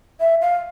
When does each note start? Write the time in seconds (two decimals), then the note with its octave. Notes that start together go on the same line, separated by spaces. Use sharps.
0.20 E5
0.41 F5